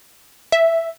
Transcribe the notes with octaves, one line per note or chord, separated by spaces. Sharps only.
E5